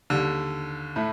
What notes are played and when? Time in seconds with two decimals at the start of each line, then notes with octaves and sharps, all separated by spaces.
0.10 D#2 D3 G3
0.96 A2 A3